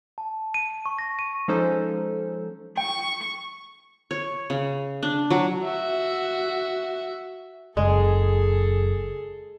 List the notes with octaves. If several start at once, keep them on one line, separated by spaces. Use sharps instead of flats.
A5
D#7
C#6
A#6
D#7
F3 G#3 C#4 D#4 A4 C5
G5 C#6
C#5
C#3
D4
F#3
F#4 E5
F#1 G#3 G#4 A4